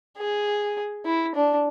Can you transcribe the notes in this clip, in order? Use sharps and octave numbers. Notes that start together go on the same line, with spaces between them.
G#4
E4
D4